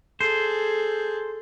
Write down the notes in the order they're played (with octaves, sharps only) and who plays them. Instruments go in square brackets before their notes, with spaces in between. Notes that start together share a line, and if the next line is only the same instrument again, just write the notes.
[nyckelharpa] G#4 A4 [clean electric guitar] C5